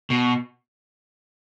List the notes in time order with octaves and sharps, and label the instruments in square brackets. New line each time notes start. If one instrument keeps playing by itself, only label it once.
[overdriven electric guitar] B2